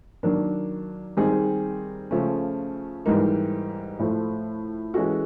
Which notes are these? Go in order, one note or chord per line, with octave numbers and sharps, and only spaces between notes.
D#3 F#3 A#3 D4
D#3 G3 C4 D#4 G#4
C#3 F3 A3 C#4
G#2 E3 G3 A#3 D#4
A2 F3 A3
E3 G#3 C#4 F#4 A4